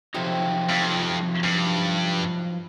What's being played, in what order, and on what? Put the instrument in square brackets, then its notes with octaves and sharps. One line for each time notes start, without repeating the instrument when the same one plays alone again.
[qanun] C3 C4 A4 [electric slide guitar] F3 F#3 D#4
[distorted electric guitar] F2
G2